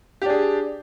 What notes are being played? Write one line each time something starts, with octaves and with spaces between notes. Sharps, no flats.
D4 G4 G#4